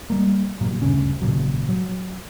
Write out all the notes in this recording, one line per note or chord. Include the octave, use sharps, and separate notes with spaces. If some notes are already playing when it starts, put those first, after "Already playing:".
G3 A#3
G1 C2 A#2 F#3
D2 G2 C#3 C#4
G#1 A#2 C#3 F#3
F#3